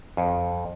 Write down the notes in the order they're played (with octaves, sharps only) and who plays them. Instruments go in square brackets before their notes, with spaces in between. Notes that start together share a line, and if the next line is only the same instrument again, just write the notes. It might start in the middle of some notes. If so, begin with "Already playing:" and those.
[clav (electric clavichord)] F2